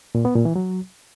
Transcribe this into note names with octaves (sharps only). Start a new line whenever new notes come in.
A#2
B3
A#2
E3
F#3